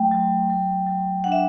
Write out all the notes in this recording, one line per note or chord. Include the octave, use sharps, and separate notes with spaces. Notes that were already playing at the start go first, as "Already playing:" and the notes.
Already playing: F#3 A3 G5
F#3
F#3
F#3
D4 F#5
E5